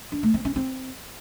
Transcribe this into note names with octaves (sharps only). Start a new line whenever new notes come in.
D4
A3
C4
C#4
C4